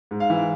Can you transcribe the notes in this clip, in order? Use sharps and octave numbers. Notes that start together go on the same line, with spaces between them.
G#2
F5
E3